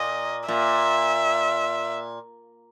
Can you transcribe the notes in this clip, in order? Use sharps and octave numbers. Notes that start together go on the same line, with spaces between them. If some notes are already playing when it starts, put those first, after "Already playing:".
Already playing: A#2 D#5
A#2 E5